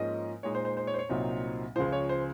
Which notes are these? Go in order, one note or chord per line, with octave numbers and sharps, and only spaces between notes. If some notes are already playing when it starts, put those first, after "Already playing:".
Already playing: G#2 F3 A#3 C#4 D#5
A#2 G#3 D#4 C#5
C5
C5
C5
C#5
C5
C#5
C2 A#2 F#3 C4 D#4
C#2 C#3 F3 C5
C#5
C5